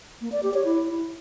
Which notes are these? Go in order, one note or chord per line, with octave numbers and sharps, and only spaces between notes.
A#3
D5
G4
C#5
E4